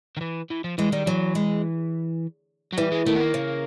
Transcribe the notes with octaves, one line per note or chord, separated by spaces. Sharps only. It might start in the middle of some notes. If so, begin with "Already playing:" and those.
D#3
E3
E3
F3
E3 G#3
D#3 G3
E3 F#3
G#3
F#3
E3 G3
G#3
D#3 A3
B3
A#3
C#3